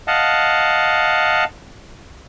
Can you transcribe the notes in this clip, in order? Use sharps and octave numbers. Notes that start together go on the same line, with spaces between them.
D#5 F5 F#5 A5